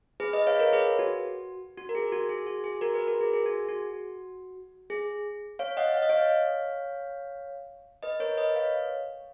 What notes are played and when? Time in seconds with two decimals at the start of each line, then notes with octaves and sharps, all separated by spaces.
0.20 G#4 B4
0.33 B4 D#5
0.47 C#5 F5
0.60 A#4 C#5
0.72 G#4 B4
0.99 F#4
1.78 F#4
1.89 A#4
1.95 G#4
2.12 F#4
2.29 G#4
2.46 F#4
2.64 G#4
2.81 F#4 A#4
2.94 G#4 B4
3.07 F#4 A#4
3.21 G#4
3.33 G#4
3.46 F#4
3.50 G#4
3.68 F#4
4.90 G#4
5.59 C#5 F5
5.77 D#5 F#5
5.94 F5
6.02 D#5
6.09 C#5 F5
8.03 B4 D#5
8.20 A#4 C#5
8.37 B4 D#5
8.56 C#5 F5